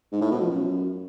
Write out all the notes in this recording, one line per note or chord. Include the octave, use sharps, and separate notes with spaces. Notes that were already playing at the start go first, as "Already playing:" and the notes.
G#2
A2
B2
F3
F#2